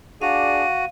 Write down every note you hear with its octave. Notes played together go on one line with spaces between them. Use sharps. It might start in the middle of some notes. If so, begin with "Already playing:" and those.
D4 F#4 G#4 D5 F5 D#7